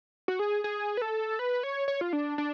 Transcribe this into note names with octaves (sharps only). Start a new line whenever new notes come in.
F#4
G#4
G#4
B4
A4
B4
C#5
C#5
F4
D4
D4